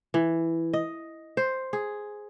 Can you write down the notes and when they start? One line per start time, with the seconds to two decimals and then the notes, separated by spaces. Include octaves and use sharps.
0.14 E3
0.73 D#5
1.37 C5
1.73 G#4